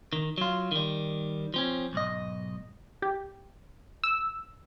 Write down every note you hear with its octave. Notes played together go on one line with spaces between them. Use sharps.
D#3
F#3 F4
D#3 G3
F3 C4 C#4
B1 G#2 D#5
G4
E6